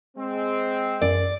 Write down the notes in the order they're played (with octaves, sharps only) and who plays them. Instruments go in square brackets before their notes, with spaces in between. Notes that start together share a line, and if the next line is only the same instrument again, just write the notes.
[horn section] G#3 C4
[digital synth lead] F#2 [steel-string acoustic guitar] D5